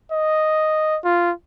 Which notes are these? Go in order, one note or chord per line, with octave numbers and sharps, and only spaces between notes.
D#5
F4